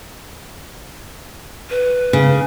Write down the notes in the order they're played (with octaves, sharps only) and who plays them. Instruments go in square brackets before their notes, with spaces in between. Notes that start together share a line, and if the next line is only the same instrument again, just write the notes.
[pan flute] B4
[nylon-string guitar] C#3